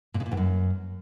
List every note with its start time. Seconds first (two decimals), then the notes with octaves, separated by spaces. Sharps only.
0.14 A#2
0.20 C#3
0.26 A#2
0.32 E2
0.37 F#2